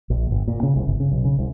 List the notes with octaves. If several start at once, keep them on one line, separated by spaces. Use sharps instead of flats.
A#1
G1
A#2
C#3
C2
G1
C#3
B1
C#3
C2